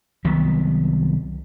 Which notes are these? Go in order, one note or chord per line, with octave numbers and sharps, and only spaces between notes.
C2 D#3 F#3 B3